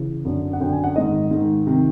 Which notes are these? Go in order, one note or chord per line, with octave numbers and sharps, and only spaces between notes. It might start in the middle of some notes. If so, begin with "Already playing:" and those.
Already playing: C#3 E3
F#2 D3
F#5
F#2 D3 G5
G#5
F#5
G#2 D#3 D#5
G#2 D#3
C3 D#3